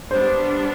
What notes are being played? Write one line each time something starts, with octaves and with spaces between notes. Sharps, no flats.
G3 B3 D4 C5